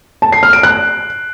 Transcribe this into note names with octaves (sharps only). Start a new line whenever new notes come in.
A5
C7
F6
D7
F#6